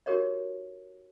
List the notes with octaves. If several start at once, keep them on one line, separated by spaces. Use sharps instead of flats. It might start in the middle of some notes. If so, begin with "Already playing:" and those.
D#4 F#4 G4 A#4 C#5 D#5